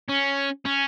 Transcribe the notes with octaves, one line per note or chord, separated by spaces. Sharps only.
C#4
C#4